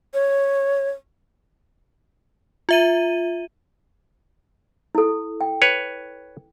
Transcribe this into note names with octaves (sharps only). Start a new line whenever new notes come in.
C#5
F4 E5 D#7
E4 A4
G5
B4 C#5